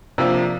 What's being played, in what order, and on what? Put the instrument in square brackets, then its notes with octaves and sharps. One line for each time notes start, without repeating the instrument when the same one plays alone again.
[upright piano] C3 F3 A#3 D4